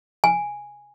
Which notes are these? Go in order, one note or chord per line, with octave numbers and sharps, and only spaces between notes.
G#5